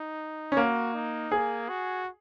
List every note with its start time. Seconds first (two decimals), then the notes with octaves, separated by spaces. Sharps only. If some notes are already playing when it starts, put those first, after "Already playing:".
Already playing: D#4
0.52 C#4
0.57 A#3 F#4
0.94 D#4
1.32 A#3 G#4
1.69 F#4